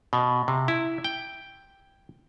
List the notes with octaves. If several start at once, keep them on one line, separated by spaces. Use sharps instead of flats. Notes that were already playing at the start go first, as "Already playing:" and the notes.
B2
C3
E4
G5